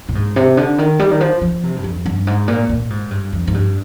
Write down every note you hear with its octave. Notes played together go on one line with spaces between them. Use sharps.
A#2
G#2
C3
D3
D#3
G3
D#3
F3
F3
C3
G2
F2
G2
G#2
A#2
A#2
G#2
G2
F2
G#2
G2